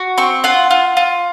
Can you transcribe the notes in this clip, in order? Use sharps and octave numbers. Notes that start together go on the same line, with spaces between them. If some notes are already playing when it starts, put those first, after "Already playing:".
Already playing: F#4
C4 C#6
F4 F#5
F4
F4